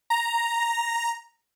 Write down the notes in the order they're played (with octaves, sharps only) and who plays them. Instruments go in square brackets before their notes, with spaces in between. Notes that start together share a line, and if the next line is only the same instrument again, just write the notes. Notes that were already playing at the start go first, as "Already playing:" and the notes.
[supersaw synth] A#5